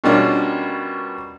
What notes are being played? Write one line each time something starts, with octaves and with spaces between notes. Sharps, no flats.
B2 G3 A#3 C#4 D4 F4